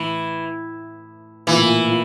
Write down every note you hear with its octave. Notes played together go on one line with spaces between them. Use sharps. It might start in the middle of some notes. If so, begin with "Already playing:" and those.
Already playing: A2 E3
A#2 E3
A2
A#2
A#2